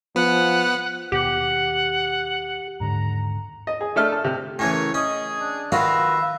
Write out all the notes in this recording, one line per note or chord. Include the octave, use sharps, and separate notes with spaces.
F3 B3 F#5
D#2 B2 G4 F#5
D#2 G#2 D3 A#5
D#5
G#4
A3 D4 A4 E5 F6
A5
C3
A2 C#3 E3 C#5 G#5
A#4
C#4 G#4 D#5
D4
D#3 F4 F#4 B4 E5 F5